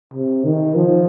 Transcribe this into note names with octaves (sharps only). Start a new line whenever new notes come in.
C3
D#3
F3